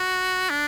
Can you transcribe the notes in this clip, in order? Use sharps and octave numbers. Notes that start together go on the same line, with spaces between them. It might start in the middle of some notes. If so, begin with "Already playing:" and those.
Already playing: F#4
D4